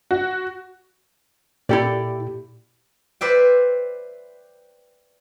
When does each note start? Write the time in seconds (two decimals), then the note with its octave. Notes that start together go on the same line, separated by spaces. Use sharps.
0.11 F#4
1.69 A#2 E4 G4 A4 D5
3.21 B4 C5 D5 E5 G5